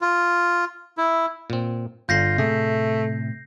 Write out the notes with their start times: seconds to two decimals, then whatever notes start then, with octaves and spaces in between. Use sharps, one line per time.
0.01 F4
0.98 E4
1.50 A#2 C4
2.09 G1 D3 F4 G6 A#6 C7
2.38 A2 C3 A3 G#4